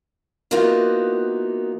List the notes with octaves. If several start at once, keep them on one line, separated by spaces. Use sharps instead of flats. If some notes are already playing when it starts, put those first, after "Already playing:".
E3 A#3 B3 D#4 F4 F#4